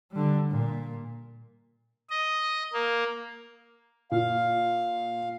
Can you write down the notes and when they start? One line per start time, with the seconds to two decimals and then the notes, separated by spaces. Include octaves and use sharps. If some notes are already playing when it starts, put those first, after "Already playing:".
0.12 D3 G3
0.50 A#2
2.10 D#5
2.73 A#3
4.11 A#2 F5